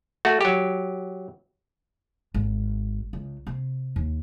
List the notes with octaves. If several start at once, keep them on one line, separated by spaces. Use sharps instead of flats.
A3 F#4
F#3 G4
G#1
C#2
C3
D#2